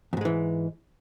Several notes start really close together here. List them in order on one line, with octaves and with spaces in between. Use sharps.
E2 G#2 G#3 E3